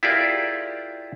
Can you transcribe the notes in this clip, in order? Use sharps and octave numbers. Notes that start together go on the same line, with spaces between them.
E4 F4 G4 G#4 A#4 D5